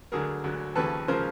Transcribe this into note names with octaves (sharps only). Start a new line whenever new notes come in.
D2 D3 F#3 G#4 A#4
D2 D3 F#3
D#2 C#3 F3 A4 B4
C#3 F3 A#4 C5